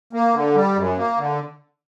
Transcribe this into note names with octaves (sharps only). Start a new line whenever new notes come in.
A#3
D3
G3
F#2
A#3
D3